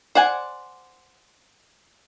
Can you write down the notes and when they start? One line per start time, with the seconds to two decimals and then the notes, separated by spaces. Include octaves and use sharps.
0.15 C5 D5 F#5 G#5